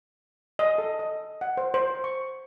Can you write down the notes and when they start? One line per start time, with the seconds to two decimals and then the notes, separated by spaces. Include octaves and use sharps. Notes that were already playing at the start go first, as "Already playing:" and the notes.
0.59 D#5
0.78 A4
0.99 D#5
1.41 F#5
1.57 C5
1.74 C5
2.04 C#6